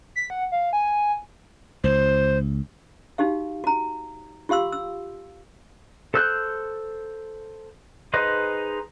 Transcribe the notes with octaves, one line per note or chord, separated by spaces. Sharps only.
B6
F#5
F5
G#5
C#2 C5
D#4 F#4 G4 F5
F#4 A#5
F4 G4 F5 C6 E6
E6
A4 C5 E6 F#6 G6
D#4 G#4 B4 C5 D#5